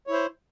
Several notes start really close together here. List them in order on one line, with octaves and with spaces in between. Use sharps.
C#5 E4 C5